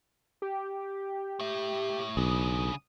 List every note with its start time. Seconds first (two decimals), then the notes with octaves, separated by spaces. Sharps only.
0.42 G4
1.39 A2 E5
2.17 B1 C#3 D4 D#6